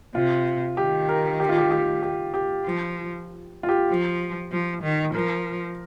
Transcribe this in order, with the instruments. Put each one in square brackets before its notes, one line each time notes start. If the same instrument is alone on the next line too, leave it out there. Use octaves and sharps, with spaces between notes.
[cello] C3 [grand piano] F4
[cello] D#3 [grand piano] G4
[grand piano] A#4
G4
F4
G4
G4
G4
G4
[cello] F3
[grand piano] F4
G4
[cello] F3
F3
D#3
[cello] F3 [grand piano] A#4